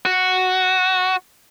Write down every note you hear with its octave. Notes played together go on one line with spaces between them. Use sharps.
F#4